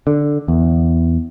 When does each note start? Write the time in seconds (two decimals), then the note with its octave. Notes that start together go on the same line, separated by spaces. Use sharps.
0.07 D3
0.48 E2